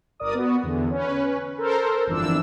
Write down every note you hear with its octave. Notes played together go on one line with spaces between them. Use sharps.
G1 A#4 D5 D#6
B3 F#4
E2 D3
C#4 B4
A4 A#4 C5
G1 F2 E3 D4 E6